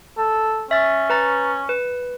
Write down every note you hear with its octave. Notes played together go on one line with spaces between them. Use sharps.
A4
C#4 E5 A6
B4 A#5 A6
B4